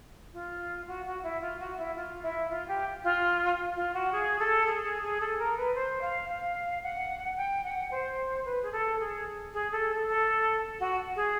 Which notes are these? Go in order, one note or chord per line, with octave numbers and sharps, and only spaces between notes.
F4
F#4
F#4
E4
F4
F#4
E4
F4
E4
F4
G4
F4
F4
F#4
G#4
A4
G#4
G#4
G#4
A4
A#4
B4
C5
F5
F5
F#5
G5
F#5
C5
B4
G#4
A4
G#4
G#4
A4
A4
A4
F#4
G#4